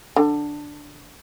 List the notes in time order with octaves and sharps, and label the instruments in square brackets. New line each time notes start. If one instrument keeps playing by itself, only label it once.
[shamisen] D3